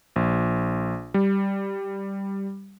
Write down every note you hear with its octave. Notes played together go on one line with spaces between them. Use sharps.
A#1
G3